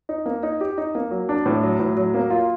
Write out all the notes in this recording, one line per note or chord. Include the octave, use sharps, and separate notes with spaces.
D#4
A#3
D#4
G4
D#4
A#3
F#3
D4
A2
F#3
A2
F#3
A#3
F4